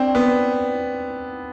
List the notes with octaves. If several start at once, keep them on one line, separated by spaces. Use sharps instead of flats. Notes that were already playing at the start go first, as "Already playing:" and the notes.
Already playing: C4 D4
B3